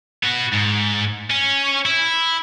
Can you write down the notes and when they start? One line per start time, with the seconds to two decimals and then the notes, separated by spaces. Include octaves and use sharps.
0.23 B3 F#4
0.53 G#2
1.30 C#4
1.86 E4